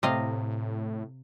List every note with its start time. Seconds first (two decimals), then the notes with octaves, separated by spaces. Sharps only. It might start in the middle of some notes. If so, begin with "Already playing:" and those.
0.03 A2 C3 D#5 F5